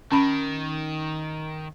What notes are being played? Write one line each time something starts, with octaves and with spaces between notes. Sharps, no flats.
D#3 C#4 B5